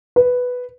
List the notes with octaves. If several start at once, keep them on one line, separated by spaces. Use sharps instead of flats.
B4